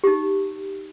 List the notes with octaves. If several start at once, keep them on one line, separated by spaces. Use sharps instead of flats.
D#4 G4